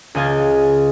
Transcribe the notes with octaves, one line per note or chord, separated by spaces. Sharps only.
C#2 G#4 D#5 F5 G#5 A6